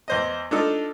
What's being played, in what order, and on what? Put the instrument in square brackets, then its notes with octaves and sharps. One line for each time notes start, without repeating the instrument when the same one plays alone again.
[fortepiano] E2 C5 D#5
D4 D#4 F4 A4